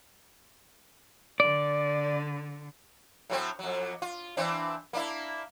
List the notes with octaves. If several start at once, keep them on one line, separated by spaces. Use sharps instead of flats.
D3 D5
A2 F#3 C4
F2 F#3
F4
E3 C4 D4
A#3 D4 E4